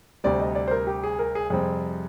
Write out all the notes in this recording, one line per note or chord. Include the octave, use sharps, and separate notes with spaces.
D2 C3 G3 D5
D#5
D5
C5
A#4
G4
G#4
A#4
G#4
F2 C3 G3 C4 G#4